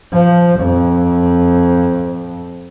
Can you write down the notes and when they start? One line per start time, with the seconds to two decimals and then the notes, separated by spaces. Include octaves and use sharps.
0.13 F3
0.60 F2